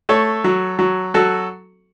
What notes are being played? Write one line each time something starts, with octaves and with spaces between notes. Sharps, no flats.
A3 A4 C#5
F#3
F#3
F#3 F#4 A4